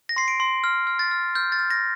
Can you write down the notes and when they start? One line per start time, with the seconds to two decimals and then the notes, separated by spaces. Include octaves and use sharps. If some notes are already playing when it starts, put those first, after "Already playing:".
0.09 A#6
0.16 C6 C7
0.28 D7
0.40 C6
0.64 F6
0.87 F6
0.99 A6
1.11 F6
1.35 F6 G6
1.52 A6
1.59 F6
1.70 A#6